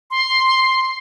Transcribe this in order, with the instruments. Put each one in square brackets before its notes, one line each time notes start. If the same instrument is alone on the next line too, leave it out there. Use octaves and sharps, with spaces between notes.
[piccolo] C6